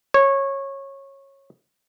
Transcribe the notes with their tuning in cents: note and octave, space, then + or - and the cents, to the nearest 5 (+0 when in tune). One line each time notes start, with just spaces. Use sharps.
C#5 -20